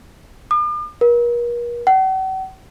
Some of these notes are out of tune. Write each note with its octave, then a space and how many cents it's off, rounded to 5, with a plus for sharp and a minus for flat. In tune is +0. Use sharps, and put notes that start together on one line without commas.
D6 +45
A#4 +40
F#5 +45